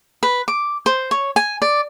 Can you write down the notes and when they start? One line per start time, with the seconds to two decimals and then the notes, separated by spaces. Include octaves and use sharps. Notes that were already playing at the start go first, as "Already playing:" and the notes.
0.23 B4
0.48 D6
0.86 C5
1.11 C#5
1.36 G#5
1.62 D5